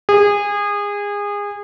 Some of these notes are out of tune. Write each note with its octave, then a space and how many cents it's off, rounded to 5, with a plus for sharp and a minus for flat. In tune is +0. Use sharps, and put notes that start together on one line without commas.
G#4 -25